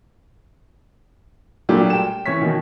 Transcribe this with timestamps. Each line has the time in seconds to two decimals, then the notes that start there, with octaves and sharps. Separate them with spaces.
1.69 A#2 F#3 G3 A3 D4 G4
1.90 G5 E7
2.26 E3 C#4 C#5 B6
2.41 B2 D#3